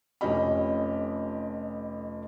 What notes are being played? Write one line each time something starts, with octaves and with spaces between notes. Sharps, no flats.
F1 F2 C#4 G4 D#5 B5